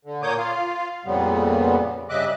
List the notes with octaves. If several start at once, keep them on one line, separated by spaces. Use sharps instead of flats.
D3
A#2 A#3 C#5 D6 D#6 G6
F4 F5
F2 A#2 C#3 G3 B3
G2 C#3 D#5 E5 D6 F#6